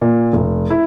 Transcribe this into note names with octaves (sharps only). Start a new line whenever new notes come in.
A#2
F1
E4